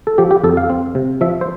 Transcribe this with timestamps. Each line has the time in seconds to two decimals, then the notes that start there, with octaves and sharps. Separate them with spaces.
0.07 A4
0.18 F3 G4
0.31 G4
0.44 F2 A4
0.57 F5
0.70 C4
0.95 C3
1.21 F3 E5
1.41 C5